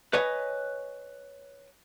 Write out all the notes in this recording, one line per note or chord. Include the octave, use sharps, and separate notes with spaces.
B4 C#5 D#5 G#5